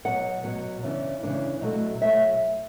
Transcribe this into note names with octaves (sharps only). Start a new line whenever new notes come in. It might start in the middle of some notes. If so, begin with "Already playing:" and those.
B2 F#3 B3 F#5
B2 F#3 B3
C#3 E3 B3 D4
C#3 E3 B3 D4
B2 F#3 A3
B2 F#3 A3 E5